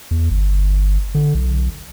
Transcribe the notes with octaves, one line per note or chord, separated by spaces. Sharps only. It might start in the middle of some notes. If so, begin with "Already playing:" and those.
E2
G1
D3
B1